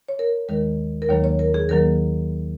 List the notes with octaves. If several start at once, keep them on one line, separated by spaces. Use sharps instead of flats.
C#5
A#4
D#2 D#3 G#3 A#4
A#4
D#2 D#3 F#3 A#3 C#5
C#5
A#4
G#4
D#2 D#3 F#3 A#3 A#4